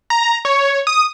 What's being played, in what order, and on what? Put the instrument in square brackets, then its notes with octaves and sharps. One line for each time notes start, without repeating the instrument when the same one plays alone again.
[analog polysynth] A#5
C#5
D#6